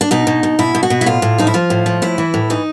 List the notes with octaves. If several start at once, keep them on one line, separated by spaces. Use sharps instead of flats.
D4
B2 D#4
B2
B2
B2 E4
B2
F#4
B2
E4
A2 F4
A2
F3 D#4
E4
F3 F4
A2
F3
A2 E4
E3
A2
E3 D#4